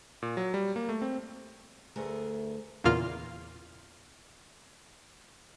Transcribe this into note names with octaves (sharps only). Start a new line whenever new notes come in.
A#2
F#3
G3
A#3
A3
C4
D2 G2 A3 G#4 A#4
E2 A#2 C#3 A#3 F4 F6